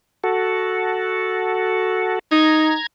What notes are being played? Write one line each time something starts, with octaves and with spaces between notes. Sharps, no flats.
F#4 A4
D#4 A#5 G#6